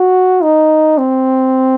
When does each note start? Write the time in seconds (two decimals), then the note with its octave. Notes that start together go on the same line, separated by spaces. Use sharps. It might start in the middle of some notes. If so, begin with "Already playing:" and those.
Already playing: F#4
0.42 D#4
0.98 C4